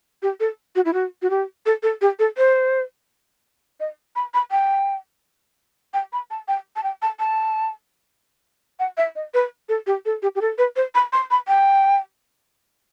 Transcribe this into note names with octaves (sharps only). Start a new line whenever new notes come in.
G4
A4
F#4
E4
F#4
F#4
G4
A4
A4
G4
A4
C5
D#5
B5
B5
G5
G5
B5
A5
G5
A5
G5
A5
A5
F#5
E5
D#5
B4
A4
G4
A4
G4
G4
A4
B4
C5
B5
C6
B5
G5